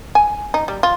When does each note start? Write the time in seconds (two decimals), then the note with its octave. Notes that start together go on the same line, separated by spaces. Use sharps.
0.15 G#5
0.54 D#4
0.68 G3
0.83 F4